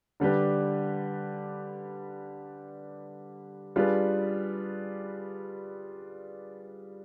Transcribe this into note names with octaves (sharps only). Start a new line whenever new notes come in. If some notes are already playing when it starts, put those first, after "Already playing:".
D3 G3 D4 G4 B4
G3 D4 F4 G#4 B4